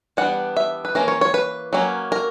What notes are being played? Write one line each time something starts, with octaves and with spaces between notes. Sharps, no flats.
E3 G3 B3 D4 F#5
E5
B4
E3 A#3 C#4 A#4
C#5
C#5
B4
F#3 A#3 C#4
A#4